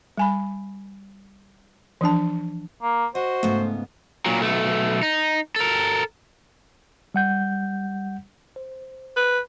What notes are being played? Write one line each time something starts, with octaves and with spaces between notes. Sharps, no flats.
G3 G#5 B5
E3 F3 D4 A5
A#3
F#4 C5 D#5
G#2 C#3 A3 B3
A#2 F#3
B1 A3
D#4
A4 A#4
G3 F#5 G6
C5
B4